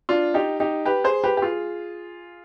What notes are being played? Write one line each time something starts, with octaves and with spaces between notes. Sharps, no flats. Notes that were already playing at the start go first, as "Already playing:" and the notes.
D4 F4
D#4 G4
D#4 G4
G4 B4
G#4 C5
G4 B4
G4
F4 G#4